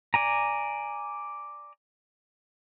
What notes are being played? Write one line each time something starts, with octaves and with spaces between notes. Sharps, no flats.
D5 G#5 A#5